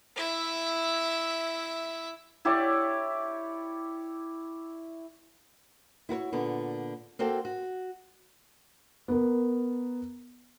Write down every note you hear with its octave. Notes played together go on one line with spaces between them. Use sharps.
E4 E5
E4 G4 C#5 D5
E4 F#4 B4 C#5
A#2 D3 B3
A#3 C4 F#4 A4 C5 G5
F#4
B3 A#4